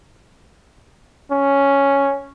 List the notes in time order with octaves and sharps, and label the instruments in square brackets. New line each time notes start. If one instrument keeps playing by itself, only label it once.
[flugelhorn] C#4